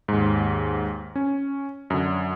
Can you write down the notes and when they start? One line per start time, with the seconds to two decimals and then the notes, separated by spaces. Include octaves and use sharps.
0.08 D#2 G#2
1.16 C#4
1.90 F#2 D3